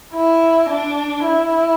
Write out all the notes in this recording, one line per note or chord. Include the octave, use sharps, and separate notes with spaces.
E4
D4
E4